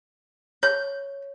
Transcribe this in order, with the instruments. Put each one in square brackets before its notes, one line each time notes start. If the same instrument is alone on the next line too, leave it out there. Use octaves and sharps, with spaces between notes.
[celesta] C#5 [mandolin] G6